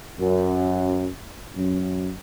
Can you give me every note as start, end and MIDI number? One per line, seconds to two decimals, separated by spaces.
0.19 1.06 42
1.56 2.10 42